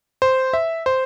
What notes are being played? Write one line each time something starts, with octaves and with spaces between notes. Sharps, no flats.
C5
E5
C5